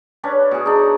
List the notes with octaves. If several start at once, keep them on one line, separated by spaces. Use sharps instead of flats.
C#4 D4 B4
B2 G#4
D4 D#4